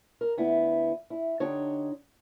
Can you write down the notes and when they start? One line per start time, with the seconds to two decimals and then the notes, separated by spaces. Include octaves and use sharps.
0.21 A#4
0.37 D2 B3 E4
1.10 E4
1.40 D3 D4 D#4 G4 C#5 D#5